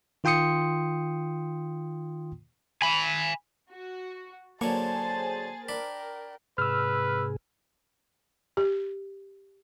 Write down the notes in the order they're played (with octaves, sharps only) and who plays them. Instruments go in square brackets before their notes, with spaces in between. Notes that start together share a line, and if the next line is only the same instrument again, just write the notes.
[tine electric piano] D#3 F4 G5 C6 D#6 C#7
[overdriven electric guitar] G#5 B5
[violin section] F#4
[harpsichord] D3 F#3 C#5 [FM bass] A#3 [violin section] G#4 C5 A6 [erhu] A5
[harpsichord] D4 B5 [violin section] A#4 [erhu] G5
[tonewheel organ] G#2 C3 G#4 [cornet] B4 [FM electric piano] E6 F6
[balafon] G4